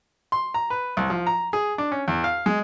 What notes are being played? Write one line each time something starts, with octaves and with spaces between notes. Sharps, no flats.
C6
A#5
B4
C2
F3
A#5
G#4
D4
C#4
E2
F5
G#3